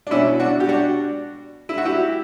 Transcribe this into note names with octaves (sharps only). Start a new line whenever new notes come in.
D4
B2 C#4 E4
D4 F#4
G4
D4 F#4
E4
F#4
E4 G4